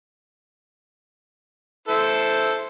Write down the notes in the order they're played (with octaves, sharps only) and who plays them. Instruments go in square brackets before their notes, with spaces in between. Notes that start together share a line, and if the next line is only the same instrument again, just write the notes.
[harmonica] E4 A4 C5